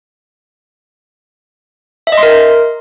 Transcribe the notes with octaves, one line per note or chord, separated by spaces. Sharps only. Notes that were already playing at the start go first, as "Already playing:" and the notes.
E5
D#5
C6
A#4